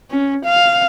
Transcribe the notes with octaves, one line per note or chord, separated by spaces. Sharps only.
C#4
F5